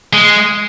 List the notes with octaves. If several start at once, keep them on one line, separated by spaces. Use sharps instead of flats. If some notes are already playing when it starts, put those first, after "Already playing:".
G#3